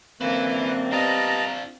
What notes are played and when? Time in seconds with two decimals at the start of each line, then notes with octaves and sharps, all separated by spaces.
0.21 F#2 D3 A#3 C4 B4 E5
0.92 G3 B3 D4 F4 D#5 A5 A#5